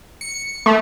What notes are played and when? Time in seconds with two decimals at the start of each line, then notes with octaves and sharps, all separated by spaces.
0.21 C#7
0.66 A3